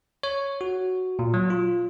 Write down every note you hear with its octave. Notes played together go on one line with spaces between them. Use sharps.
C#5
F#4
A#2
F#3
F4